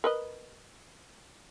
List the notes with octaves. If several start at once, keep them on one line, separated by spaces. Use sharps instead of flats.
A#4 B4 D#5